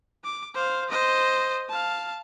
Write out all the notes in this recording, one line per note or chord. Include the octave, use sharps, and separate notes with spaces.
D6
C5 F5
C5 D#5
F5 A5